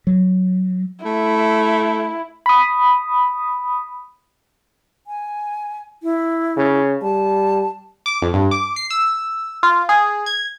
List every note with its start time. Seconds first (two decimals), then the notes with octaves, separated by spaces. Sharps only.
0.07 F#3
1.05 A3 E4
2.46 B5 D#6
5.07 G#5
6.03 E4
6.57 C#3
7.02 G3 A5
8.06 D6
8.22 F2
8.34 G2
8.51 D6
8.76 C7
8.90 E6
9.63 F4
9.89 G#4
10.26 G#6